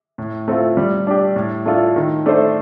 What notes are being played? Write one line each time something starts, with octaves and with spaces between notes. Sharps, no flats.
A2
A3 C4 F4
G3
D4 G4
A2
A3 D4 F4 A4
D#3
A3 D4 A4 C5